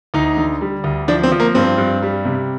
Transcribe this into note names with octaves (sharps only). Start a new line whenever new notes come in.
D2 D#4
D3
G3
D2
F3 D4
C4
F3
A#3
G2 C4
G2
G3
C3